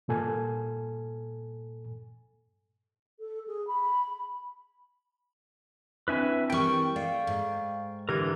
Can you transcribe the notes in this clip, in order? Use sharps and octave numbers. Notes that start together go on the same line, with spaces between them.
G2 A#2 A4 G#5
A4
G#4
B5
C4 D4 E4 B4 E5 G#5
E3 G3 C4 A#4 G5 C#6
A3 D5 F5
G#2
D3 E3 G4 A#4 G#6